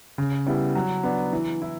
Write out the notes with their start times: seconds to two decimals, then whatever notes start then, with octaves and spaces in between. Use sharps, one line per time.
0.18 C#3
0.47 G3 B3 E4
0.75 F#3
1.03 B3 D4
1.32 E3
1.62 E4